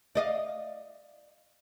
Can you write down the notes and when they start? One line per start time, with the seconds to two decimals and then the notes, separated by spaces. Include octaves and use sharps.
0.15 D5 D#5 F5